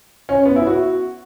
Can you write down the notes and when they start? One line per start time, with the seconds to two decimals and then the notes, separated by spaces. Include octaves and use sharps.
0.29 C#4
0.45 B3
0.56 E4
0.67 F#4